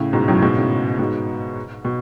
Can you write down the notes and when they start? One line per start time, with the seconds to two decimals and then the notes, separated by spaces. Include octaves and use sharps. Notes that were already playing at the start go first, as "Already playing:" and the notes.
Already playing: A2 C#3
0.13 G#2 B2
0.28 F#2 A2
0.42 G#2 B2
0.56 A2 C#3
0.99 G#2 B2
1.85 B2